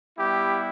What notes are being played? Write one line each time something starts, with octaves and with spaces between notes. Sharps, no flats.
G3 B3 E4 G4